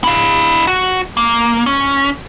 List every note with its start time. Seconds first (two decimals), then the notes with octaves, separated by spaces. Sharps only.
0.04 E4 F5
0.67 F#4
1.17 A#3
1.66 C#4